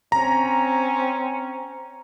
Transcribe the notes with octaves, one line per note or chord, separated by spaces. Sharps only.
C4 C#4 A#5